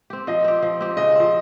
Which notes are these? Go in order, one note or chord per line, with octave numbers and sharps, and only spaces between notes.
C4 G4
F3 D#5
C4 G4
F3
C4 G4
C#3 D#5
F3 C4